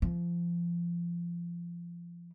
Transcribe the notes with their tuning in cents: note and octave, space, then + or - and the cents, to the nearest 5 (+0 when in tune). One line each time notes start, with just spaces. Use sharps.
F3 -25